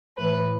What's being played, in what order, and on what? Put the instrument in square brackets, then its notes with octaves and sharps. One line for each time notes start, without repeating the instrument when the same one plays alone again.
[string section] A2 E3 B4